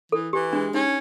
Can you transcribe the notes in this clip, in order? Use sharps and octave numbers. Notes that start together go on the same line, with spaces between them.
E3 A4
E3 G4
G#3 D4
C#4 D#4